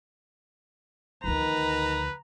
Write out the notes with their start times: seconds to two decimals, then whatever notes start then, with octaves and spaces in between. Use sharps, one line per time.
1.24 D2 D#3 F3 B4 A#5